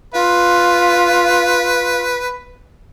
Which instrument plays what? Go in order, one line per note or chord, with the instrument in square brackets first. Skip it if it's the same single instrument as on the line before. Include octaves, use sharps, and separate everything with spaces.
[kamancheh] F4 [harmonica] B4